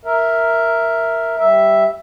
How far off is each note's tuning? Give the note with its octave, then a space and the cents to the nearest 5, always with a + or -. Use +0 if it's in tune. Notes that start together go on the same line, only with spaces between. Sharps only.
A#4 +0 E5 +0
G3 +0 E5 +0